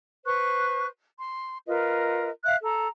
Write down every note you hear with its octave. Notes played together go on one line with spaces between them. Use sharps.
B4 C5 C#6 F#6
C6
F4 A#4 B4 D#5
E5 F5 F#6
A4 A#5